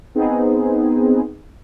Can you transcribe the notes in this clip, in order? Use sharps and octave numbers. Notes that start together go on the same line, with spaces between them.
B3 C4 D#4 G#4